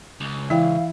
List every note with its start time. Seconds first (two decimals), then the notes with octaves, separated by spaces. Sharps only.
0.21 C#2
0.50 E3 E4 F5 G5